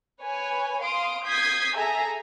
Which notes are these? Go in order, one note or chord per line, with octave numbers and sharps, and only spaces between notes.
B4 C#5 G#5
F5 C6 D#6 D7
D#6 G6 G#6 B6 C7
G#4 A4 E5 G#5 A#5